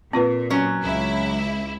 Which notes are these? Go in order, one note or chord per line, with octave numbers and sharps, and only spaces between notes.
A#2 C4 F4 B4
F#3 C#4
C#2 E4